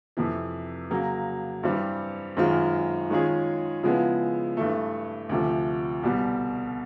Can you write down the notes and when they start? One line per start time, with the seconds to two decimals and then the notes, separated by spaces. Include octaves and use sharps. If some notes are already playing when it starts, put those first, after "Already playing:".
0.17 F2 C3 E3
0.90 C#3 F#3 A#3
1.63 G2 E3 G3 C4
2.37 F#2 D#3 G#3 C4 F4
3.10 D#3 G#3 C#4 F4 G#4
3.83 C#3 F3 G#3 B3 E4
4.57 G2 E3 A3
5.29 D2 C3 F3
6.03 C2 B2 G3